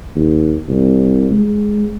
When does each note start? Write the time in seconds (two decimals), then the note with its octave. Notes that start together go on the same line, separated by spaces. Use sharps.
0.15 D#2
0.69 C2
1.31 G#3